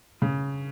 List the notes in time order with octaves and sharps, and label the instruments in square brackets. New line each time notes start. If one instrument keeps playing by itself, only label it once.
[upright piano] C#3